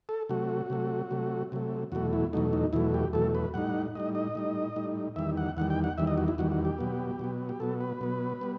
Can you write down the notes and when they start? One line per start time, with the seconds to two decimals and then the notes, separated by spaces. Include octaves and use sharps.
0.09 A4
0.29 C3 F#3 A3 F#4
0.70 C3 F#3 A3
1.11 C3 F#3 A3
1.52 C3 F#3 A3
1.92 E2 B2 F#3 A3 F#4
2.13 E4
2.33 E2 B2 F#3 A3 D#4
2.53 D#4
2.73 E2 B2 F#3 A3 E4
2.94 G4
3.13 E2 B2 F#3 A3 A4
3.35 B4
3.54 A2 G3 D#4 F#5
3.95 A2 G3 D#4 D#5
4.15 D#5
4.35 A2 G3 D#4
4.76 A2 G3 D#4
5.16 E2 D#3 G3 E5
5.37 F#5
5.57 E2 D#3 G3 F#5
5.70 G5
5.84 F#5
5.98 E2 D#3 G3 E5
6.07 D#5
6.18 F#4
6.28 E4
6.38 E2 D#3 G3 F#4
6.52 F#4
6.65 G4
6.78 B2 F#3 B3
7.19 B2 F#3 B3
7.49 G4
7.60 B2 F#3 B3 A4
7.81 B4
8.01 B2 F#3 B3
8.41 G3 B3